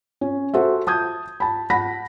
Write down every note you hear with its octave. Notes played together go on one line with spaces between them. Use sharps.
C#4
F#4 A4 C5 E5
A5 D#6 G6 G#6
A5 B5
F#5 A5 B5 A#6 B6